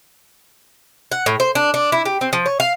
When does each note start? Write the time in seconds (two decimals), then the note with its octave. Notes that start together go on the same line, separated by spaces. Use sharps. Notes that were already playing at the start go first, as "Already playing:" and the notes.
1.12 F#5
1.26 A2
1.40 C5
1.55 D4
1.74 D4
1.92 E4
2.05 G4
2.21 C4
2.33 F3
2.46 C#5
2.60 F5